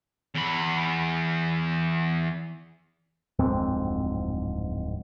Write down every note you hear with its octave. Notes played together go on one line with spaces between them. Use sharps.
E2 B5
D1 F2 G#2 C4